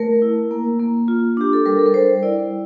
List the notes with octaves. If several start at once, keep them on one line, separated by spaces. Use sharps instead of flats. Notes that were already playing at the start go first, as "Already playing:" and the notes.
Already playing: A3 A#4
E4
A#3
A#3
F4
D4 G4
A4
G3 A#4
A4
A#4
G3 C5
E4 D5